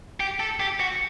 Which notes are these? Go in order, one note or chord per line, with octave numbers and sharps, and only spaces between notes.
G4
A4
G4
F#4